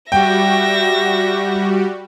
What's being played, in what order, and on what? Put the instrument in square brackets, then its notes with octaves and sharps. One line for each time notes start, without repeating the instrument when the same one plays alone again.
[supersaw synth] G3 F#4 G4 [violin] E5 A#6 [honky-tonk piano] G5